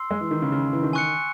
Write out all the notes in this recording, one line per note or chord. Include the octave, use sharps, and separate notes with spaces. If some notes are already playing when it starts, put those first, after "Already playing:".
Already playing: C6 E6 C7
G#3
E3
D#3
C#3
C#3
E3
D#3
G#5 C#6 F#6 C#7